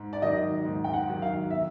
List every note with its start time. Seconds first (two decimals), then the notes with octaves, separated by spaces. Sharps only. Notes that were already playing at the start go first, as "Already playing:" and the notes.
Already playing: G#2
0.13 D5
0.22 D#3 F#3 D#5
0.65 G#2
0.84 G5
0.93 F#5
1.08 D#3 F#3
1.22 F5
1.50 B2 E5